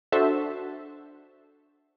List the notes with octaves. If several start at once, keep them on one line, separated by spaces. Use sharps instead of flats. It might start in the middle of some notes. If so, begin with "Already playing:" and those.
D4 F#4 A4 C5 E5